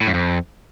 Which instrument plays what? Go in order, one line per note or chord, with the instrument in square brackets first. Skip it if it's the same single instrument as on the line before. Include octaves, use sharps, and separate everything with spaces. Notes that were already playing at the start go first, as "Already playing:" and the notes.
[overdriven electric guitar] A2
F#2
F2